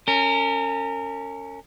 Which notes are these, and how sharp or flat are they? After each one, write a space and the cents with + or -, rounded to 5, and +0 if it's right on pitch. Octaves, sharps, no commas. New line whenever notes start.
C#4 +0 A#4 -35